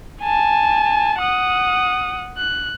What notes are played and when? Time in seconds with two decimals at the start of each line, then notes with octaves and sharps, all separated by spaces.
0.22 G#5 A5
1.19 F#5 D#6
2.38 F#6